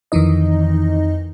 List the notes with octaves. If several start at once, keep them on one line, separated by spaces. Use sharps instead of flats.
F2 D#3 E3 D#4 D#5